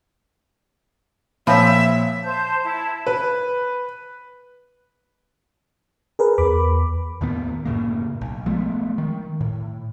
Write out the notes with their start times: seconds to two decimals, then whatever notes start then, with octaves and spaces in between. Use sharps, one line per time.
1.47 A#2 F3 C4 C#5 E5 B5 E6
2.23 C5 A5 G6
2.63 E4 A5
3.07 B4
6.19 G#4 A#4 B4
6.38 E2 B5 D6
7.21 D#2 A2 D#3 B3
7.65 F#2 A2 C#3 A#3
8.21 B1
8.46 F3 G#3 A3 B3
8.98 D#3
9.41 A2